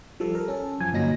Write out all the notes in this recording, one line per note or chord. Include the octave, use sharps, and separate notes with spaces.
F3 G3 A4
A4 A#4
C#4 A4
F#2 F3 G#5
G1 A#2 F#3 D#4 G#5 A#6